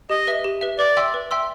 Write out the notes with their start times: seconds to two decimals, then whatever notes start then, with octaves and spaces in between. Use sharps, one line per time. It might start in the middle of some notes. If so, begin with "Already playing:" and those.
0.10 G4 D#5
0.27 B4 E5
0.44 G4
0.61 B4 E5
0.79 B4 D5
0.97 E5 G5 C6 E6
1.14 B4
1.31 E5 G5 C6 E6